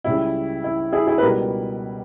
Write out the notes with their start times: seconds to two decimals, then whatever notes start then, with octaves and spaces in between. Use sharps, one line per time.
0.04 C#2 C#3 G3 E4
0.64 E4
0.93 E4 G#4
1.07 E4 G#4
1.18 B4
1.22 C#2 B2 G3 B3 G4 A#4